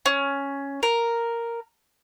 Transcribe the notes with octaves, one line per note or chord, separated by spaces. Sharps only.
C#4
A#4